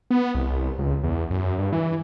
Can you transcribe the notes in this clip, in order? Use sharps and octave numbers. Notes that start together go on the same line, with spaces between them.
B3
C2
C#2
E2
F#2
G2
E3